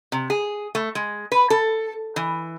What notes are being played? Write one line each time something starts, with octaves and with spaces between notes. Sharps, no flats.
C3
G#4
A3
G#3
B4
A4
E3